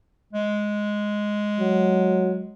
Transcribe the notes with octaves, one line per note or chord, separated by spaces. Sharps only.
G#3
F#3